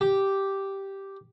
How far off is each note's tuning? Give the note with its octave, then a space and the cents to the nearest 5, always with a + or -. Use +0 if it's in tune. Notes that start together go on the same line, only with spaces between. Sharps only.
G4 -5